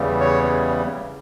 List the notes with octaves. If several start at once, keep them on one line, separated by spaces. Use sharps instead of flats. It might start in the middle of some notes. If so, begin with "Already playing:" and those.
Already playing: E2 C#3 E3 G3
C#5